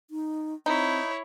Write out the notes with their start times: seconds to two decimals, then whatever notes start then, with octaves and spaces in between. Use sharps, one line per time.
0.10 D#4
0.66 C4 D#4 E4 C#5